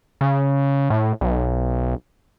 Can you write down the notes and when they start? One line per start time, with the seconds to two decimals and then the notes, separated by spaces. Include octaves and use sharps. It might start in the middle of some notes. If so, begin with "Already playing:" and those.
0.21 C#3
0.90 A2
1.21 B1